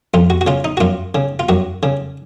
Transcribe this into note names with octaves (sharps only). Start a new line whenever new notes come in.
F2 F4
F#4
F#4
C#3 F4
D#4
F#4
F#2 F4
C#3
F4
F#2 F#4
C#3